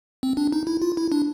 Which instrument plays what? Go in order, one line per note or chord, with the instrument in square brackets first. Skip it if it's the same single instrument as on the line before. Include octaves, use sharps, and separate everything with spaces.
[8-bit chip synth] C4
D4
D#4
E4
F4
E4
D4